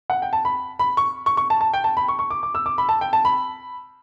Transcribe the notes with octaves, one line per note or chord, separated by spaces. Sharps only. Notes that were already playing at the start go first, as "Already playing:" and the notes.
F#5
G5
A5
B5
B5
C#6
C#6
C#6
A5
A5
G5
A5
B5
C#6
C#6
D6
D6
E6
D6
B5
A5
G5
A5
B5